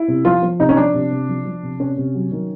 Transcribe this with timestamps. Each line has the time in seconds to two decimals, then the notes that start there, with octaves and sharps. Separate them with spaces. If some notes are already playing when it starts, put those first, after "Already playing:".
Already playing: E4
0.08 C3
0.25 F3 F4
0.42 F3
0.59 C3 D#4
0.69 C#4
0.77 F3 D4
0.94 C3
1.11 C3
1.29 F3
1.46 F3
1.63 C3
1.80 C3 C#4
1.97 C3
2.15 F#3
2.32 D#3